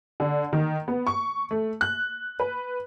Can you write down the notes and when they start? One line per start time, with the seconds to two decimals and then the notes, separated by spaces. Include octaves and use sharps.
0.20 D3
0.53 D#3
0.88 B3
1.07 C#6
1.51 A3
1.81 F#6
2.40 B4